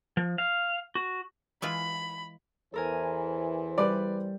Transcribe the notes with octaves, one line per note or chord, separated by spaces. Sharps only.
F3
F5
F#4
E3 G#3 F4 B5
E2 E3 A4 A#4 C5 G#5
G3 B4 D5